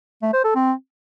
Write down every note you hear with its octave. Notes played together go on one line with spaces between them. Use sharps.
A3
C5
A4
C4